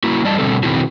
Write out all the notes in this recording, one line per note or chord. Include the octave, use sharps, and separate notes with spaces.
A#3 E4 F#4
G3 D5 D#5 A5
B2 D3 F3 G3 C4 A4
B2 D#3 C4 E4 F#4 G#4